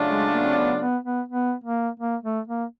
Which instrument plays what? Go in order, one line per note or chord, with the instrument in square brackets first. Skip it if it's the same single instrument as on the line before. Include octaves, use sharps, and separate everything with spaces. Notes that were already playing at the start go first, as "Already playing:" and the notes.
Already playing: [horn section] C#3 F#3 A3 D4 F4
[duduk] G#3
A#3
C4
B3
B3
B3
B3
A#3
A#3
A3
A#3